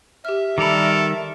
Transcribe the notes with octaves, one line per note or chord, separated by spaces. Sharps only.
G4 E5 F6
D#3 G3 A4 A#4 B5 D6